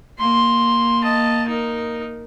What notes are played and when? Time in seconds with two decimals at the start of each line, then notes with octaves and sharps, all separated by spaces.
0.19 A#3 C6
1.03 D#5 A5
1.48 D#4 A#4